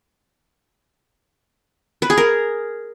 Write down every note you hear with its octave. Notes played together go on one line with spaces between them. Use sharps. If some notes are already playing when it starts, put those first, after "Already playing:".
B4
G#4
A#4